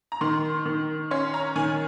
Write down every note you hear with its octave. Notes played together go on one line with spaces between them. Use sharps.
A#5
D#3 C6
D#3
C#4 C6
A#5
D#3 G#5